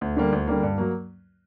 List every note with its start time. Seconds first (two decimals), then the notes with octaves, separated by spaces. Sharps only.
0.01 D2
0.16 D3 G3 A#3
0.32 D2
0.47 D3 G3 A#3
0.63 G2
0.78 F#3 A#3